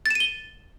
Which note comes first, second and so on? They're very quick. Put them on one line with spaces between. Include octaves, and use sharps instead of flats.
A6 E7 D#7 G7